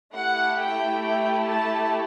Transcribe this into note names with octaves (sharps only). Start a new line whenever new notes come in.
A3 E4 G4 F#5
G5
G5
A5